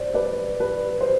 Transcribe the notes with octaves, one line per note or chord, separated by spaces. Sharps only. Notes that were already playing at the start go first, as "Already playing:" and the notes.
Already playing: C5 D5
B4 D5
B4
C5